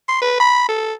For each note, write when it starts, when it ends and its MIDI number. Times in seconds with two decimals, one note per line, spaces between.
0.09 0.20 84
0.22 0.38 71
0.40 0.68 83
0.69 0.94 69